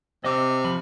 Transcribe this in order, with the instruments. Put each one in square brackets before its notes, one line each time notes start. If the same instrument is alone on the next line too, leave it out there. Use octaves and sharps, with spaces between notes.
[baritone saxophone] C3 [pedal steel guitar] D#5 D6 E6
[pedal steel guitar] F3 F4 B5